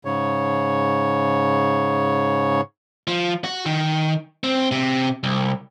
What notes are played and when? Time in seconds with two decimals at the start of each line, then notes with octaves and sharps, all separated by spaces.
0.05 G#2 C#3 C#5
3.07 F3
3.44 F#4
3.66 D#3
4.44 C4
4.71 C3
5.23 C2